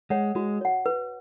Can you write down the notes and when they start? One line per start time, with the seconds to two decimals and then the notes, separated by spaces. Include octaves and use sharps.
0.10 G#3 C#5 F#5
0.35 G#3 F#4
0.61 C#5 F#5
0.86 B4